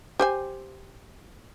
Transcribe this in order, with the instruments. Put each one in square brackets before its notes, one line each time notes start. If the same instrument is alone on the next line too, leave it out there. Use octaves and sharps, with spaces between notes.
[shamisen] G4 C5 G#5